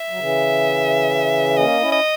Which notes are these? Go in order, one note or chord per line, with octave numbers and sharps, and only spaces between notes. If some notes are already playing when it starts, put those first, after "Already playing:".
Already playing: E5
F#3
C#3 E3
A#3 C#4 D#5
C#4 E4
D#5